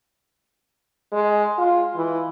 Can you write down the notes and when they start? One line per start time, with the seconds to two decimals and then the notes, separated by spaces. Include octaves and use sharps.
1.12 G#3
1.58 F4
1.96 E3